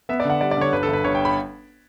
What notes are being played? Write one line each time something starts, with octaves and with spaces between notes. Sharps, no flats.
B3 E5
D5
D3 F#5
G3 D5
D5
D3 C#5
G1 B4
A4
G1
B4
G1 C#5
G5
B5